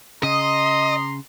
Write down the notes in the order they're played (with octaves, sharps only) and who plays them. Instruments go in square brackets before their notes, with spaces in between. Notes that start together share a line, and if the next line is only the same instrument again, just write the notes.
[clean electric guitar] C#3 [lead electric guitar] D#5 [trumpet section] A#5 C6 [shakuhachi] D#6